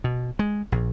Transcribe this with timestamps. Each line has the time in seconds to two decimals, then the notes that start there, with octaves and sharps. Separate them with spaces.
0.04 B2
0.39 G#3
0.72 A#1